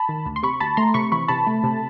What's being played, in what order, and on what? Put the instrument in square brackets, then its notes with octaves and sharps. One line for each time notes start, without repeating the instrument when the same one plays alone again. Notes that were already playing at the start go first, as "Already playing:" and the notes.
Already playing: [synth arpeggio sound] A5 B5
D#3
D2
C6
C3 B5 C#6
D2 A5 B5
A3 A#5 C6
C3 B5 C#6
E3 B5 C#6
C3 A5 B5
A3
C3